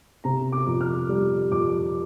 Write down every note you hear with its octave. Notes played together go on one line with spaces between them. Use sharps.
C3 A#5
D6
F2
F6
G3
F2 D6